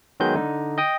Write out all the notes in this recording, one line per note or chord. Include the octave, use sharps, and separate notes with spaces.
D#3 F#3 G#3 B3 G6
D3 D#4
D#5 G5 D#6